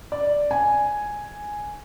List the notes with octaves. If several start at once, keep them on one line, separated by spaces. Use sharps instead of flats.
D5
G#5